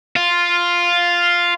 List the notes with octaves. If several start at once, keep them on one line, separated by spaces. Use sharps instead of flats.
F4